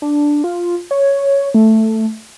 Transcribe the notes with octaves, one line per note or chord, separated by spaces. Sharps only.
D4
F4
C#5
A3